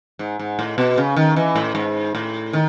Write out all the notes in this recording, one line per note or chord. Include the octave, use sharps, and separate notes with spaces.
G#2
G#2
A2
B2
C#3
D#3
E3
A2
G#2
A2
D#3